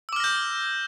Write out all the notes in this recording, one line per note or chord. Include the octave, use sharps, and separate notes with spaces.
D6 E6 F6 G6 A#6